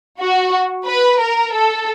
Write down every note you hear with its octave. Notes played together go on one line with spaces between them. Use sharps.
F#4
B4
A#4
A4